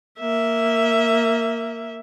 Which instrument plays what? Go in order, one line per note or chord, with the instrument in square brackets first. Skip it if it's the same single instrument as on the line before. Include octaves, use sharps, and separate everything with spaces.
[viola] A#3 E5